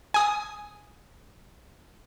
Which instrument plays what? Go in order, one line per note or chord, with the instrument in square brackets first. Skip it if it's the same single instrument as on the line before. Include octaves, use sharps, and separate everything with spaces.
[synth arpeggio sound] G#5 D#6